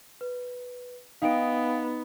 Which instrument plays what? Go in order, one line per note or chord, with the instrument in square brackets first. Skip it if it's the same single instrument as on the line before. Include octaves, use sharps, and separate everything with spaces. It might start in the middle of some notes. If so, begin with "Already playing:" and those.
[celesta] B4
[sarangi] B3 [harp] D#4 [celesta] F5 G5 D7